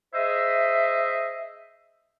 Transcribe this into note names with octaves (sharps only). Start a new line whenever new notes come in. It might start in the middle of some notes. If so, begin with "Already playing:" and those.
G#4 C5 D#5 E5